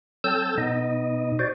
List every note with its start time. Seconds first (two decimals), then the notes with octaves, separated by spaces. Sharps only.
0.24 F#3 C4 A4 A5 E6 G6
0.58 B2 B3 D#4 D#5
1.39 F#4 C5 D5